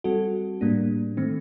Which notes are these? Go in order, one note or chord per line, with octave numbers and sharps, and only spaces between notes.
G3 C4 F#4 A4
A2 G3 A#3 D4
D#3 A3 C4